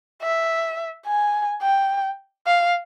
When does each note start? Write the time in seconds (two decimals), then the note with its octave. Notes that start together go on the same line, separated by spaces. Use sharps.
0.23 E5
1.07 G#5
1.62 G5
2.47 F5